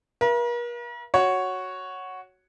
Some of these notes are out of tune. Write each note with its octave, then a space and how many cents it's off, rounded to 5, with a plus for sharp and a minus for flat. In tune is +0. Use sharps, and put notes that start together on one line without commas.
A#4 +45 E5 +45
F#4 +0 C#5 +0